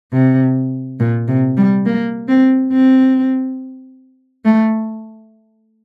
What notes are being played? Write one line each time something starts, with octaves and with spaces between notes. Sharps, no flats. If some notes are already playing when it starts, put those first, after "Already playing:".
C3
A#2
C3
G3
A#3
C4
C4
A3